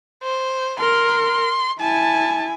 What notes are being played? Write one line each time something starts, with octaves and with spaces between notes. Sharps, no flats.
C5
A#4 C6
E4 G#5 A5